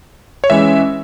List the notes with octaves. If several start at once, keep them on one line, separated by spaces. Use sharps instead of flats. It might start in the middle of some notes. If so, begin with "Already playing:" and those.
C#5
E3 G#3 C#4 E5